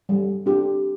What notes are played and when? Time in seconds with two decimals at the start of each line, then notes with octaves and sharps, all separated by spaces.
0.09 G3
0.46 D4 G4